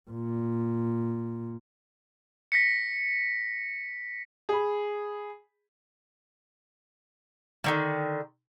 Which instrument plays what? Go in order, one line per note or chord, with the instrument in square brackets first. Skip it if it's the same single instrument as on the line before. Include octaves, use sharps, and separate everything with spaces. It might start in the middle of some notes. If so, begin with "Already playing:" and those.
[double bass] A#2
[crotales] A#6 B6 C#7
[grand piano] G#4 B5
[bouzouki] D3 D#3 G3